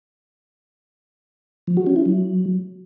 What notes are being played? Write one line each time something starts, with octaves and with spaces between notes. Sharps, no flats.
F3
F#4
C#4
E4
F#3